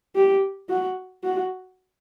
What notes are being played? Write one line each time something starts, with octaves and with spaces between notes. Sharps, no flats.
G4
F#4
F#4